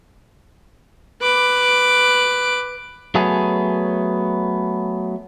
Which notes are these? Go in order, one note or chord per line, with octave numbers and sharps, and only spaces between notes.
B4 D6
F#3 A3 B3 G#4